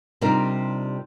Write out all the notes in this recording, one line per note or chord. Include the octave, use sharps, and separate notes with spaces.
C3 G3 D4 D#4 F4 A#4